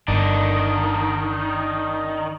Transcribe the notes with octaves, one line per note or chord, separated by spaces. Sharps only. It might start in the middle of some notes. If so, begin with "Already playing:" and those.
G1 D#3 D4